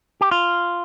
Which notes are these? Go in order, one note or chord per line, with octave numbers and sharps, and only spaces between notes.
G4
F4